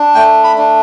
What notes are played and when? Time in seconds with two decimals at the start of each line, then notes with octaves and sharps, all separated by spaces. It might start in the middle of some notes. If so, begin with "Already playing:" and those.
Already playing: D4
0.15 A3 G5
0.44 B5
0.58 D4